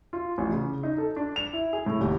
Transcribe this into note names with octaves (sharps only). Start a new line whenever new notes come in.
F4
A1
C#3
D#4
A4
D4
F7
E4
G#4
A2
D#1